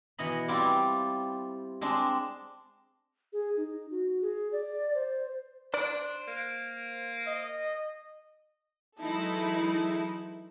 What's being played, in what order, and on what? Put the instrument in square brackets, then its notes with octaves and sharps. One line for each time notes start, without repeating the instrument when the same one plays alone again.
[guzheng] B2 E3 D#5 B5
G3 C4 E4 F4 D5
G#3 C4 D4
[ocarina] G#4
D#4
F#4
G#4
D5
C5
[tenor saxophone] D4 [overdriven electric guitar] C5 [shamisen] D5
[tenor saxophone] A#3
[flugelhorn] D#5
[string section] E3 F#3 G#3 D#4 E4 A4